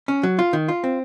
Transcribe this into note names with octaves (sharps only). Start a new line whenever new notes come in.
C#4
F#3
F4
D#3
F4
C4